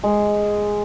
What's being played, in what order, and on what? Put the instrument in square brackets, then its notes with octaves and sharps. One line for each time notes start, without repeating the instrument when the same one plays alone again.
[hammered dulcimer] G#3